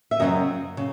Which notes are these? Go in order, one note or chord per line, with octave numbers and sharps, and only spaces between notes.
E5
F#2 C#3 F#3 C4 D#5
C#3